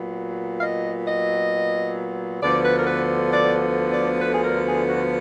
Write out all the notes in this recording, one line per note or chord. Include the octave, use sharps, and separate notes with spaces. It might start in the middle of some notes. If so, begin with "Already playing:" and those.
Already playing: A#2 F#3 B3
F5
D#5
D#5
D2 D3 F3 B3 D5
B4
A#4
B4
D5
D5
B4
G#4
A#4
G#4
F#4